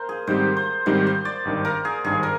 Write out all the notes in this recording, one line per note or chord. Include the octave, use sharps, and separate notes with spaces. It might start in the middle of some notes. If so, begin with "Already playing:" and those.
Already playing: A#4 C5
G#4
G#2 D#3 G3 C4 G4 C5
C5
G#2 D#3 G3 C4 G4 C5
C5
D5
G#1 G2 D#3
A#4
G#4
G#1 G2 D#3 G#4
A#4